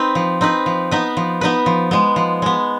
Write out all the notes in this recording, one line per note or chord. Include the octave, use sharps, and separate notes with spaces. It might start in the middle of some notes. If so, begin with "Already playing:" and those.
Already playing: C4 D#4 B4
F3
C4 D#4 B4
F3
B3 D#4 B4
F3
B3 D#4 B4
F3
G#3 B3
F3
G#3 B3